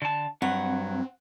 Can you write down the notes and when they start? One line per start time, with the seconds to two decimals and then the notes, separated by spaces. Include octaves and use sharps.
0.02 D3 A5
0.42 G2 F#3 C4 F#5